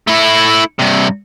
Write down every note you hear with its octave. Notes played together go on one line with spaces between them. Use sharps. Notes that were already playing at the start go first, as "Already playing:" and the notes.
A3 E4
G2 C3